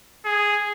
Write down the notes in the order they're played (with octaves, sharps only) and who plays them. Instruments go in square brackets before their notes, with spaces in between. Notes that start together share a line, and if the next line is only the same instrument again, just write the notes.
[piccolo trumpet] G#4